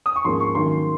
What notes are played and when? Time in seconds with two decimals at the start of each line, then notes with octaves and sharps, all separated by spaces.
0.06 D#6
0.16 C#6
0.25 G#2 F3 A#3 C#4 C6
0.40 C#6
0.55 F#2 D#3 A#3 C#4 C6